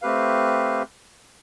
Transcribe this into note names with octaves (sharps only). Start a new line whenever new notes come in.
A3 C4 G4 B4 F5